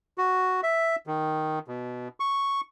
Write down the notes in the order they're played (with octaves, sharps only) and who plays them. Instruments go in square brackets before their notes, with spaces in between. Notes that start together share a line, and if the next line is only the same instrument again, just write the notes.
[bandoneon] F#4
E5
D#3
B2
C#6